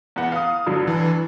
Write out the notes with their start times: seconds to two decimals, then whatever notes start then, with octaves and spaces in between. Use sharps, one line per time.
0.16 E2 B3 F#5
0.32 F5 D#6
0.66 G2 D3 F#3
0.88 E3